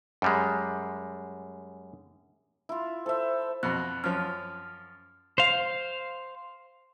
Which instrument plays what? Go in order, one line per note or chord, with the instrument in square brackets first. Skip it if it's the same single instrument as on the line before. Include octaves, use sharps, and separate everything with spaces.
[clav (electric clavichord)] F#2 G3 G#3
[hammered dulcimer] E4 F4
[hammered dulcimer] A4 E5 [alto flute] C5
[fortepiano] F2 B2 [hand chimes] F#6
[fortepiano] F#2 F3 [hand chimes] F6
[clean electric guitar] C5 F5